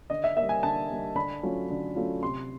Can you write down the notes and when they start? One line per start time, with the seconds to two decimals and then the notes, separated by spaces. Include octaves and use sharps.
0.10 D3 D#5
0.24 E5
0.37 G3 A#3 E5
0.49 G#5
0.63 D3 A5
0.90 G3 A#3
1.15 D3 B5
1.43 F#3 A3 C#4 F4
1.69 D3
1.95 F#3 A3 C#4 F4
2.23 C3 C6